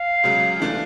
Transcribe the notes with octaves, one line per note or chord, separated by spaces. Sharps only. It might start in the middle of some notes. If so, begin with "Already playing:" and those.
Already playing: F5
C#2 C#3 F#3
E3 A3 D4 F4